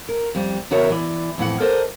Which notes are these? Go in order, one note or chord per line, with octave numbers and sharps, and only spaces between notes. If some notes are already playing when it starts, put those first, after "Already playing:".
A#4
F2 G3
E2 C#3 F#4 A#4 C#5 E5
E3 D5
F2 A2 E3 F#5
A4 A#4 C5 D5 D#5